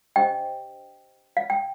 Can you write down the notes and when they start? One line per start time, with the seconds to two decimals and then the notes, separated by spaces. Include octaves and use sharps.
0.16 D4 G4 C5 D#5 G5
1.37 F5
1.50 G5